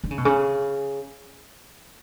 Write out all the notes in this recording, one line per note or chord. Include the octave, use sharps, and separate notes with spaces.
D3
C#3
B2
C#3